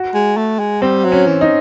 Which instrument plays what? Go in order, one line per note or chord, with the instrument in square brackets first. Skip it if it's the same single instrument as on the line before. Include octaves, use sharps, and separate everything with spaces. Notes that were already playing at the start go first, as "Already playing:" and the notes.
Already playing: [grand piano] F#4
[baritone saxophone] G#3
A3
G#3
[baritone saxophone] G3 [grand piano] C4
[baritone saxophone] F#3
[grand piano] C#4
[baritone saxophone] E3
[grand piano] D#4